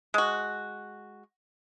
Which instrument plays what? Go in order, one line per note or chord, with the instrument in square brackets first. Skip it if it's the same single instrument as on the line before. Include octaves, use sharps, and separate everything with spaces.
[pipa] G#3 F#4